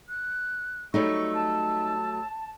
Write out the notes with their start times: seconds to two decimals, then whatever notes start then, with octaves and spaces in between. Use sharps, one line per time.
0.09 F#6
0.94 F#3 G3 A3 D#4 C#6 E6
1.35 A5